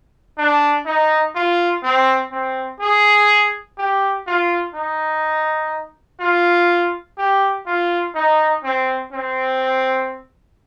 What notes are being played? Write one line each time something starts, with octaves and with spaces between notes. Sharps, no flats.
D4
D#4
F4
C4
C4
G#4
G4
F4
D#4
F4
G4
F4
D#4
C4
C4